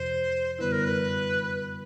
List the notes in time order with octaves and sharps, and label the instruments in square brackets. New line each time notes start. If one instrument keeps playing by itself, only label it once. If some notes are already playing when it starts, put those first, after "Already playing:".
Already playing: [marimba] F2 C3 F3 [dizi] C5
[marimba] F#2 D3 G3 B3 E4 [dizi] B4
[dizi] A#4
B4